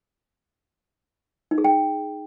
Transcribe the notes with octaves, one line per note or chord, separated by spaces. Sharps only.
D#4
G#4
G5